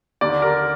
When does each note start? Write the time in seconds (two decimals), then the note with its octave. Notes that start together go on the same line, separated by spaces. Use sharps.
0.21 D#2 D3 D5
0.42 A#4